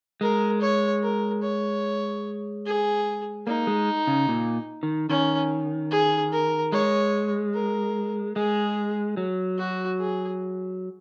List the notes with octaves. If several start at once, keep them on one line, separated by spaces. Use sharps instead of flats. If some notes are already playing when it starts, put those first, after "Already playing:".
G#3 A#4
C#5
A#4
C#5
G#4
A#3 D#4
G#3
C#3
A#2
D#3
D#3 C#4
G#4
A#4
G#3 C#5
A#4
G#3 G#4
F#3
F#4
G#4